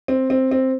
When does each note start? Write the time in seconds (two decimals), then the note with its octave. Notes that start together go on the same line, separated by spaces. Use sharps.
0.08 C4
0.30 C4
0.51 C4